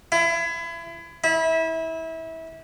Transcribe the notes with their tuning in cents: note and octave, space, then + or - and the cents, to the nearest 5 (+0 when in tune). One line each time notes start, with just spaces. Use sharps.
E4 +30
E4 -25